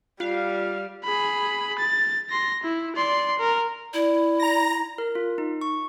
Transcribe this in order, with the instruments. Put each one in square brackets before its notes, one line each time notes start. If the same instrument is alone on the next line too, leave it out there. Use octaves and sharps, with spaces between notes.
[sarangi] G3 [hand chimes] F4 [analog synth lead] F5
[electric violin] G#4 B5
A6
C6 A#6
E4
D5 C6
A#4
[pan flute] E4 [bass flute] D5
[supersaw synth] A#5 A#6
[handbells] A#4
F4
D#4
C#6